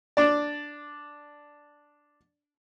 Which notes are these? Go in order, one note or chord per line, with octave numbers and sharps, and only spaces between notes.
D4 D5